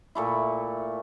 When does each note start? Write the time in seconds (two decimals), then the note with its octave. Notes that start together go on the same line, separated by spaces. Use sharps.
0.15 A#2 A3 E4